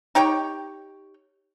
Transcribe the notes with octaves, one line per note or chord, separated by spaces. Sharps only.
D#4 G4 C#5 G5